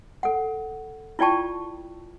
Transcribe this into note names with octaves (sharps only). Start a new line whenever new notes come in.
A4 F#5
E4 F4 D5 G5 A5 C#6